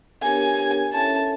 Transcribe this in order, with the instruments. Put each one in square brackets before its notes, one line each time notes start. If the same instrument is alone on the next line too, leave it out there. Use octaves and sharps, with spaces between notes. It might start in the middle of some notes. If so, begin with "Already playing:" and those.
[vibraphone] B3 D4 G4 A#4 C#5 [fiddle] G#5
[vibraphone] C#4 E4 A4 C#5 E5 [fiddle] A5